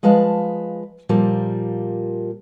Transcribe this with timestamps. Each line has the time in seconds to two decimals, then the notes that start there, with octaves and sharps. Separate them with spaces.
0.03 F3 G#3 B4 F5 A5
1.09 A#2 F3 G3 A#3